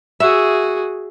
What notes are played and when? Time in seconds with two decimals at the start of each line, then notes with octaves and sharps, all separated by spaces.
0.20 F#4 G#4 E5